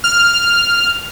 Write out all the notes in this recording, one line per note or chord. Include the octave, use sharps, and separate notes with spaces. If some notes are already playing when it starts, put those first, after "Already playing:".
F6